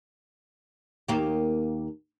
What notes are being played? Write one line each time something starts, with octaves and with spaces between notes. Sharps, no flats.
D#2 A#3 G4